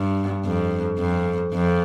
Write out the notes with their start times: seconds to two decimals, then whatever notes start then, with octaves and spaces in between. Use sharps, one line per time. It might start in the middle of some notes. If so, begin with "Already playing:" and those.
Already playing: G2
0.44 F2
0.99 F2
1.54 F2